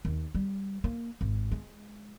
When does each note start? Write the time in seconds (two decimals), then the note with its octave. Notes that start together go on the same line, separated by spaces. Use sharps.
0.05 D#2
0.35 G3
0.84 A#3
1.21 G#1
1.52 G#3